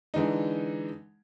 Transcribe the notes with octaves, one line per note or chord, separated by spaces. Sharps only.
D3 E3 G#3 D#4